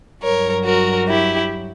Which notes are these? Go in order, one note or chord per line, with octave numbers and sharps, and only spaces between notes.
G2 F#3 A#4 C#5
F#4 A#4
E4 G4